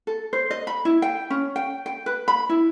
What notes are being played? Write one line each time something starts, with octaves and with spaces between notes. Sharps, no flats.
A4
C5
D#5
B5
E4
G5
C#4
G5
G5
B4
B5
E4